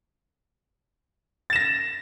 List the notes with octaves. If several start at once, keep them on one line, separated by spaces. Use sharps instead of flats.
A6 A#6 E7